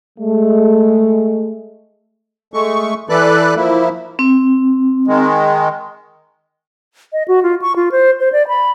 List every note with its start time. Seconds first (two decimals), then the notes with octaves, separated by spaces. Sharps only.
0.19 G#3 A3
2.54 G#3 A3 C#6
3.09 E3 A4 B4 D5 F#6
3.56 F3 A#3 E4
4.19 C4
5.08 D#3 G#3
7.13 D#5
7.28 F#4
7.43 F4
7.62 C#6
7.76 F4
7.92 C5
8.20 C5
8.32 D5
8.48 B5